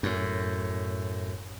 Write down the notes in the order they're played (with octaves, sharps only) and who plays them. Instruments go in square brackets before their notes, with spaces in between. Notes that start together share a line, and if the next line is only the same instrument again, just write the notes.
[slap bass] F#2 A2